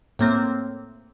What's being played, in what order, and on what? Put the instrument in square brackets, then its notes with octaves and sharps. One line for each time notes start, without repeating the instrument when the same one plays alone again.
[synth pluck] A2 A#3 C4